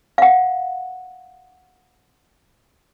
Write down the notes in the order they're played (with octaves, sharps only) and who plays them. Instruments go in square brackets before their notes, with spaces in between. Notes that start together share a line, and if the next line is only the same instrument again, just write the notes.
[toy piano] F5 F#5